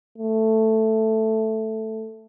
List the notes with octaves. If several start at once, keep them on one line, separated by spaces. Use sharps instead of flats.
A3